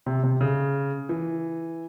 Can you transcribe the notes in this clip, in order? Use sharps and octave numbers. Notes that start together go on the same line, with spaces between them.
C3
C3
C#3
E3